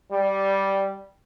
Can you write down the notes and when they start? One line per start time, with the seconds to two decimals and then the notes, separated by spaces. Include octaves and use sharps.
0.11 G3